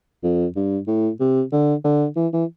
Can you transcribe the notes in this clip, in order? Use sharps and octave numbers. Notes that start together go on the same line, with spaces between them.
F2
G2
A2
C3
D3
D3
E3
E3